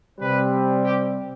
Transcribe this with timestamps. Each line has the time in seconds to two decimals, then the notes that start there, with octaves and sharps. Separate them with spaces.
0.19 C3 G3 C4 B4
0.84 G4